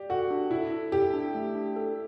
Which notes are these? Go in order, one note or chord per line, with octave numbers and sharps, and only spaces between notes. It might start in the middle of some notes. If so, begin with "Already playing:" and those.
Already playing: G4 D5
F#4 A4
D4
E4 A4
A4
G4 A4
D4
A3
D4
A4